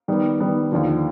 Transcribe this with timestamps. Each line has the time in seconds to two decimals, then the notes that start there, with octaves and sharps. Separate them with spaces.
0.08 D#3 G3 B3
0.40 D#3 G3 B3
0.72 D#2 D3 F3